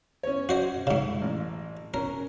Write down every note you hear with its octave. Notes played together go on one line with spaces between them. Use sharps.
C#4 C#5
F#4 C5 D#5
G#2 C#3
A1
C#4 A#4